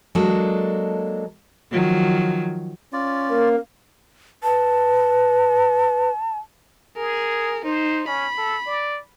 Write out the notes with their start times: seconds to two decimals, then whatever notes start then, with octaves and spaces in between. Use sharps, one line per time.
0.15 F#3 G#3 A#3 D4 A4
1.71 D#3 F3 F#3
2.93 C#4 F4 D5
3.30 A#3 A#4
4.43 B4 A5
6.96 G#4 A#4
7.64 D#4 C5
8.08 C#4 B5
8.38 A4
8.67 D5